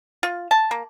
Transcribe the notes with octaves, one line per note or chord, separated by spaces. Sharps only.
F4
A5
A#3